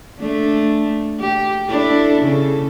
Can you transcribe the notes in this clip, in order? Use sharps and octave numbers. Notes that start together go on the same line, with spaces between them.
A3 D4
G4
D4 E4 A4
C#3 A4